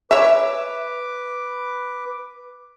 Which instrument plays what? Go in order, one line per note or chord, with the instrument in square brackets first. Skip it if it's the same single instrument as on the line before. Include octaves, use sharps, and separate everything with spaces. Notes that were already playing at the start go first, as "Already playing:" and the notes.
[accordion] B4 D6 [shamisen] C#5 E5